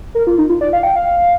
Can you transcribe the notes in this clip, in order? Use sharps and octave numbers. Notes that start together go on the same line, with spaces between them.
A#4
F4
D#4
F4
D5
F5
G5
F5